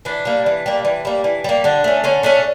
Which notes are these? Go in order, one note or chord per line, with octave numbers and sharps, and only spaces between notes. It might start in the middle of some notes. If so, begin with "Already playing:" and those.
E3 D4
G3 A#3
E3
G3 A#3
E3
G3 A#3
E3
G3 A#3
D3 D4
A3 C#4
D3 C#4
A3 C#4 D4